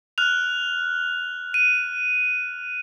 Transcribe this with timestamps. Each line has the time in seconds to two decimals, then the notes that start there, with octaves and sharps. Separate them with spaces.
0.18 F6 F#6 F7
1.54 D#7